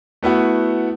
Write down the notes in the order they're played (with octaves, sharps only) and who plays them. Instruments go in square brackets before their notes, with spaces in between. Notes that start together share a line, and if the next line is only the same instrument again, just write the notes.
[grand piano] A3 B3 E4 F#4